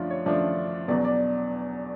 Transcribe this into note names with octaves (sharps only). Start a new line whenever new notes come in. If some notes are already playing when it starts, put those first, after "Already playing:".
Already playing: F#2 D3 F3 A3 D4 F4
C#5
F#2 D3 F3 A3 D4 D5
E2 B2 F#3 D5
D5